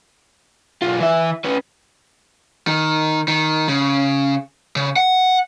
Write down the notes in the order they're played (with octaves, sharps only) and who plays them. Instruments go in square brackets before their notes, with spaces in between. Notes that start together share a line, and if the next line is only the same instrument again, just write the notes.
[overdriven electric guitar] B1 F4
E3 E5
C#4 B4
D#3
D#3
C#3
C#3
F#5